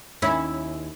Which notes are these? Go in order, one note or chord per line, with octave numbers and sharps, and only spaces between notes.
D#2 C#4 E4